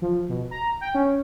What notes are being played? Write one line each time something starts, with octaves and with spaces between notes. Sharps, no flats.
F3
B2
A#5
G5
C#4